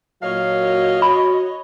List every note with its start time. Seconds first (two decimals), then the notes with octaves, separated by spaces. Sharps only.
0.22 A#2 F#3 C#5 D#5 F5
1.02 F#4 B5